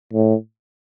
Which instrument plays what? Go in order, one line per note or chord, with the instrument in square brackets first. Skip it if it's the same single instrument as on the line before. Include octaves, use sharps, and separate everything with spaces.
[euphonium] A2